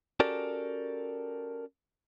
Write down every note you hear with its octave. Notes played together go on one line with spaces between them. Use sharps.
C#4 F#4 G4 A4 A#4 D5